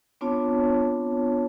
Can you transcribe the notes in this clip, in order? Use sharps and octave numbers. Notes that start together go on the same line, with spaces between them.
B3 C4 D4 F4 C#5 A5